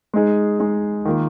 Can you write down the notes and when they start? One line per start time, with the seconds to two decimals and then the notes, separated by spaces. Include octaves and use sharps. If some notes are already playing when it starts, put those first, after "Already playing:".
0.14 G#3 D#4 G#4
0.59 G#3 D#4 G#4
1.05 D#3 A#3 F4